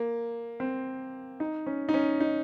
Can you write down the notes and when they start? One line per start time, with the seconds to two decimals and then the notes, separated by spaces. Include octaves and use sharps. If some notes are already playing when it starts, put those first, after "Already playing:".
Already playing: A#3
0.60 C4
1.40 D#4
1.67 C#4
1.89 D#4
1.94 C#4
2.21 D#4